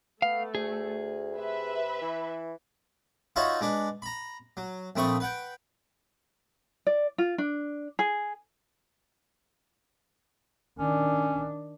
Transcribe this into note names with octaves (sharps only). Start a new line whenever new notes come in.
A3 B3 F5
D2 G#4
C3 B4 E5
E3
D#4 F4 F#4 C#5 E5 B5
G#3 D4 B4
A#5 B5
F#3
A#1 A3 C4 B5 C#6 D#6
B4 F#5 G5
D5
F4
D4
G#4
D#3 C#4 D4